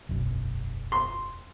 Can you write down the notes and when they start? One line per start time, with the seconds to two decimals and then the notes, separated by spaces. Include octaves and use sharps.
0.09 E1 B1 F#2
0.92 C6